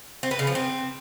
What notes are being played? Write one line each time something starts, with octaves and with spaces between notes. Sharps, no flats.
C4
B3
C#3
F3
C4